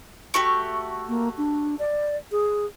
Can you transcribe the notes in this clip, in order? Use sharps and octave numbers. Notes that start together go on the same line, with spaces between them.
A3 F#4 G4
A#3
D4
D5
G#4